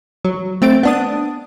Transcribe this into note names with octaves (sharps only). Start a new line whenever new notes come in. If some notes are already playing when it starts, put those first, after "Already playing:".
F#3
A3 C4 A6 D7
B3 D4 D#6